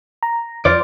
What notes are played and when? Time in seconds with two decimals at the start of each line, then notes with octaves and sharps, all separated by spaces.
0.23 A#5
0.65 F2 F4 C5 D5 F6 A6